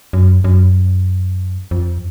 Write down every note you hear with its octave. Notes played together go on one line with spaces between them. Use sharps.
F#2
F#2
F2